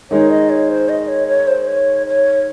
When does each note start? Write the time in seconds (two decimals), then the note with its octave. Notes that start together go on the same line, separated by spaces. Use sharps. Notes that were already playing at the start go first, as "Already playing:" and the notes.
0.11 D#3 G#3 D#4 C#5
0.30 D#5
0.50 C#5
0.69 C5
0.89 D#5
1.08 C#5
1.28 C#5
1.48 C5
1.67 C#5
2.07 C#5